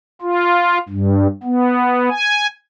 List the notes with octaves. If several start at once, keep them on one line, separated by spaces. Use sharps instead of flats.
F4
G2
B3
G#5